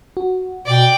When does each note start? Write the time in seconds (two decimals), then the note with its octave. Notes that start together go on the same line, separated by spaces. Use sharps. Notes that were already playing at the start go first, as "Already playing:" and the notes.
0.17 F#4
0.66 B2 D5 G5